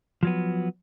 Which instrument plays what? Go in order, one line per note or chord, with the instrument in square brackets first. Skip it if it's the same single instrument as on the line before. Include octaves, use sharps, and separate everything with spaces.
[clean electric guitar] F3 F#3 B3